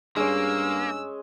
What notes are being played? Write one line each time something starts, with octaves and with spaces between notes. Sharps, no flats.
G2 G#3 A#3 C#4 E6